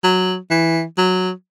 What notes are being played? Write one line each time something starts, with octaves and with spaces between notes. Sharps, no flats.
F#3
E3
F#3